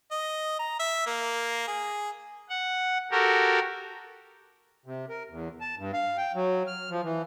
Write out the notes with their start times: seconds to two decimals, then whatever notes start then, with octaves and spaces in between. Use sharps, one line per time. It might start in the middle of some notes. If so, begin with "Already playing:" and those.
0.11 D#5
0.59 A#5
0.79 E5
1.06 A#3
1.67 G#4
2.50 F#5
3.11 F#4 G4 A4 A#4
4.86 C3
5.09 A#4
5.30 E2
5.61 A5
5.78 G2
5.94 F5
6.17 G5
6.35 F#3
6.67 F6
6.90 F3
7.03 E3